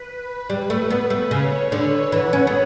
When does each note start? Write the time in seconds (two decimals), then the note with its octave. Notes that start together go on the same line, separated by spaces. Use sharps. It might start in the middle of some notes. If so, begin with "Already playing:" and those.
Already playing: B4
0.50 G3
0.70 A3
0.90 B3
1.10 A3
1.31 C#3 C#5
1.72 D3 B4
2.12 E3 F#5
2.33 C#4
2.47 B3